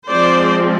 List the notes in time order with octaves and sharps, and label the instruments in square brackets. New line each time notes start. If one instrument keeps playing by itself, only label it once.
[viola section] F3 G#3 C4 C5 D5